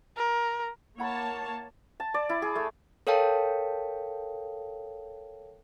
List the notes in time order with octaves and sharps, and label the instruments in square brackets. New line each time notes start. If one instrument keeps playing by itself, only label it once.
[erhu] A#4
[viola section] A#3 C#5 A5 [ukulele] E4 F#5 B5
[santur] A5
D5
E4
G#4
A3
[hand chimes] A4 A#4 C#5 F5 G5 A5